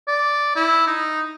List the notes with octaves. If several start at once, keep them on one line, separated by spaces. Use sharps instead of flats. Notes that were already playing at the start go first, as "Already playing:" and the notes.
D5
E4
D#4